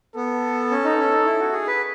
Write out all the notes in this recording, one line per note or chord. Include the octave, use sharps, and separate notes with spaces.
B3 A4
C#4
D#4
C#4
D#4
E4
F#4
G#4
B4